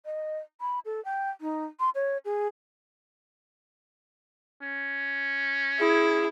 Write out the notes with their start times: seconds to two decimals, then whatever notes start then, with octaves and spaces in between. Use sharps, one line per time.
0.05 D#5
0.61 B5
0.86 A4
1.05 G5
1.41 D#4
1.80 C6
1.95 C#5
2.25 G#4
4.62 C#4
5.79 E4 G#4